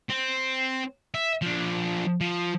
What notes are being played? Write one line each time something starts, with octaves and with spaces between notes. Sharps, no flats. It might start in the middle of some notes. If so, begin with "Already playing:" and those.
C4
E5
F3 D4
F3